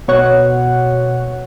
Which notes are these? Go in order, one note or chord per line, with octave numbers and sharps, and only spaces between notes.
B2 C#5 F#5